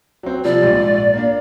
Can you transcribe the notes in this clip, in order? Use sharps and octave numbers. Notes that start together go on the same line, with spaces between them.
F#3 C4
C3 F3 G3 D5
A#1 G#2
A#3 D4